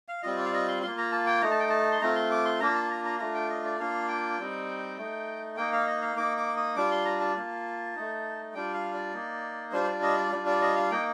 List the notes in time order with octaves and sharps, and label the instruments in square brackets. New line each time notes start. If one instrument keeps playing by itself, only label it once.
[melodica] F5
G3 C4 F4 D#5
D5
F5
D#5
C6
A#3 F4 C6
A#5
A5
G5
A3 D#4 A#5
A5
G5
A5
C6
A3 C4 F4 A#5
C6
D6
C6
A#3 D4 F4 A#5
A5
A#5
A#5
A3 D4 F4 A#5
G5
D#5
D5
A#3 D4 F4 F5
G5
G3 C4 D#4
A3 D#4
A#3 D#4 G5
F5
D#5
F5
A#3 D#4 D6
D6
D#6
G3 D4 F4 D6
C6
A#5
A5
A#3 F4
A3 D#4
G3 D4 F4 G5
F5
D5
A#3 D#4
G3 D4 F4 C5
C5
D5
D#5
D5
G3 D4 F4 D5
D5
D#5
F5
A#3 D#4 G5